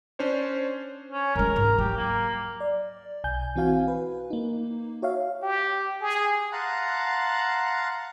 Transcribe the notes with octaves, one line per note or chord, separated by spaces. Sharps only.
C#4 D4 C5 C#5
C#4
F#2 G#3 A#4
G#2
F#3 G4
A#3
D5
B1 G#5 G6
E3 C4 F#4 F5 G#5
B4
A#3 D#4
F#4 C#5 E5 F5
G4
G#4
F5 F#5 A5 A#5 C6 F#6